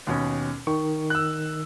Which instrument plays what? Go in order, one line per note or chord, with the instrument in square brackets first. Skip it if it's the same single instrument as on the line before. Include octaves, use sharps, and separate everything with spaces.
[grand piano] D#2 B2 C#4
[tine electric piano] D#3 [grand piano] C#6
[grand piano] E6 F#6